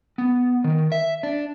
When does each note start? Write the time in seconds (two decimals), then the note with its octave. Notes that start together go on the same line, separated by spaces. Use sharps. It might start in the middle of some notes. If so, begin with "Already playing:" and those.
0.18 B3
0.64 D#3
0.92 E5
1.23 D4